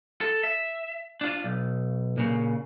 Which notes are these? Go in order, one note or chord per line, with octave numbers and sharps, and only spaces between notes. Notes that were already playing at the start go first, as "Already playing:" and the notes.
A4
E5
D4 F4
B1
A#2 C#3